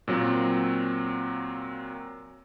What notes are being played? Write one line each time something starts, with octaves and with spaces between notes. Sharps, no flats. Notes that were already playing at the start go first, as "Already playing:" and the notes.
A#2 F#3 C4